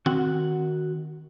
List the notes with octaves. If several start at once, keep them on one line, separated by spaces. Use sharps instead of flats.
D#3 C4 F#4 F#5